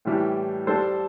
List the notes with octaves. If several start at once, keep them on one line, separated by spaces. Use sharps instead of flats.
A2 E3 G3 D4 G4
G3 D4 A4 C5